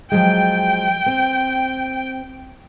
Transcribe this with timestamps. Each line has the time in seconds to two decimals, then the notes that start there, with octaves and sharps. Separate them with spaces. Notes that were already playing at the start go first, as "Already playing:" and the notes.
0.12 F3 F#3 G#3 G5
1.06 C4